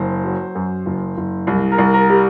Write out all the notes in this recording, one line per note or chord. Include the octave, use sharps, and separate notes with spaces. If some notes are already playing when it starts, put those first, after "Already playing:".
Already playing: F#1 C5
F#3
F#2
F#1
F#1
C2
A#4
C2
A#4
G3